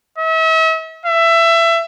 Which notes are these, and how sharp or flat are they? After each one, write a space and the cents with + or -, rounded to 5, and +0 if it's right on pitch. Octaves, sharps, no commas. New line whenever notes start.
E5 -40
E5 +20